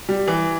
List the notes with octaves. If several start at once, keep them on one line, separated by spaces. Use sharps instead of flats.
G3
E3